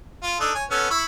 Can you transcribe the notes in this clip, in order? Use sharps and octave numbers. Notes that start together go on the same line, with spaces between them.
F4
D4 D#4 A4
C#5 G#5
B3 C#4 A4
E4 B5 C#6